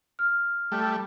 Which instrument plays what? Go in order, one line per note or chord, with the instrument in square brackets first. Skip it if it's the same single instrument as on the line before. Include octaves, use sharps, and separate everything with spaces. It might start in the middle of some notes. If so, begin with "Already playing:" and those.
[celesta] F6
[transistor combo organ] G3 A3